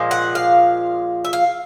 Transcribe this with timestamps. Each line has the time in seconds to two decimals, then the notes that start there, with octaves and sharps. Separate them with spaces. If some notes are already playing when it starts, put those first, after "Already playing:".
Already playing: A#2 F3 G#3
0.11 F#5
0.35 F5
1.25 E5
1.33 F5